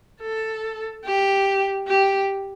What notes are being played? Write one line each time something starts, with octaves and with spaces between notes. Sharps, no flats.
A4
G4
G4